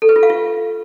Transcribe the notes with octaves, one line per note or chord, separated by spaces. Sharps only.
A4
B4
F4
F5
F4